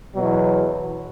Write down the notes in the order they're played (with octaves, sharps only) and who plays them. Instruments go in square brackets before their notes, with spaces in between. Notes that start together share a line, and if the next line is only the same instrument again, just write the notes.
[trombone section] E2 B2 F#3